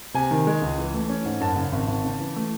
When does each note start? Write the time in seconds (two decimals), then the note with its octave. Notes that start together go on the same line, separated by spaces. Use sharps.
0.14 C3 G#5
0.31 D#3
0.47 G#3
0.62 C#2
0.78 E3
0.94 A3
1.09 C#4
1.25 G#2
1.40 F#2 A5
1.56 C#3
1.73 G#1
1.88 G#1
2.04 C#3
2.20 E3
2.36 A3